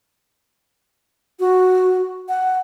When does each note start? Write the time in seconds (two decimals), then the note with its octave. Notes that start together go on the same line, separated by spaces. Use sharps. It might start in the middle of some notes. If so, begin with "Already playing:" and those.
1.40 F#4
2.29 F#5